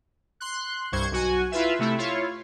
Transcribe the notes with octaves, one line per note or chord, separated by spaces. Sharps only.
C6 F#6
C2 G2 C5 C#6 G#6
B1 F#4 G#5
E4 F4 B4 E5
C3 A3 E4
E4 F4 C#5